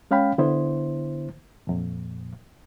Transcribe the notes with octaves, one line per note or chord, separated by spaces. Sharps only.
G#3 C#4 F5 G5 B5
D3 B3 E4 C5
F2 A#2